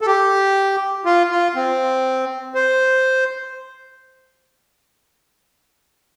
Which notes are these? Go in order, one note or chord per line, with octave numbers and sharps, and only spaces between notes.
A4
G4
F4
F4
C4
C5